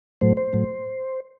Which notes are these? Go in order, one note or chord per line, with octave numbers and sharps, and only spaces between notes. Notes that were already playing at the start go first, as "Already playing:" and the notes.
A2 F#3 A3 C5
C5
A2 F#3 A3